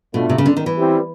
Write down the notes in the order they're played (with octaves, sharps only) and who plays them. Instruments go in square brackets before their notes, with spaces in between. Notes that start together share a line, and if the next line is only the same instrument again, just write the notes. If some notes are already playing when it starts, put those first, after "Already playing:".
[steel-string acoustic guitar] B2 [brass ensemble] A3 D4 F4
[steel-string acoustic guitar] C3
C#3
D3
D#3
E3
[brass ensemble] G3 C4 E4 G4